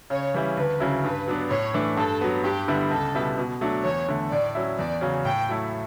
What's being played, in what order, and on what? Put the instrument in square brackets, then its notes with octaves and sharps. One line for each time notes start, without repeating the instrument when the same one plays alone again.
[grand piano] C#3 [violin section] C#5
[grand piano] E3 G3 C#4 E4
[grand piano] D2 [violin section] B4
[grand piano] C#3 F#3 C#4 E4
[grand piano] G2 [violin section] B4
[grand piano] F#3 B3 D4
[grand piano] A2 [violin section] C#5
[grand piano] E3 A3 D4
[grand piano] G2 [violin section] A4
[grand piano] F#3 B3
[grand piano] G2 [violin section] G4
[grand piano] D3 G3 B3 E4
[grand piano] C#2 [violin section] A4
[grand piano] B2 G3 B3 E4
B2
F#3 A3 D4
[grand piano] E2 [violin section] C#5
[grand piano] D3 A3
[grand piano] A2 [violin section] D5
[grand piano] F#3 C#4 E4
[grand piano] E2 [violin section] D5
[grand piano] C#3 F#3 C#4
[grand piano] A2 [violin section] G5
[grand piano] F#3 A3 E4